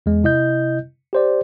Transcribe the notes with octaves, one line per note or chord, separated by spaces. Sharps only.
E2 G#3
C3 E4 D#5 G6
G4 C5 D5